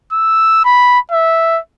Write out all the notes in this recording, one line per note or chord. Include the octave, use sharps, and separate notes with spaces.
E6
B5
E5